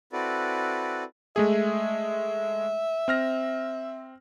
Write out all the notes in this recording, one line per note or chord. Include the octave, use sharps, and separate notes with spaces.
C4 E4 F#4 A4 B4 D5
G#3 A3 G#4 E5
C4 F6 A#6